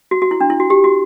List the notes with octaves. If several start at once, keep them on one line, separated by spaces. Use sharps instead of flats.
F#4
F#4
E4
D4
E4
F#4
G4
F#4